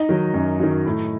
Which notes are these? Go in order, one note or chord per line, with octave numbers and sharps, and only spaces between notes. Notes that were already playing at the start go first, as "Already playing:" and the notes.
Already playing: D#4 D#5
D#3 F#3
F#2
D#3 F#3
A2